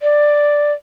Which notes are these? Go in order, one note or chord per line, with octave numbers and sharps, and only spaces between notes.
D5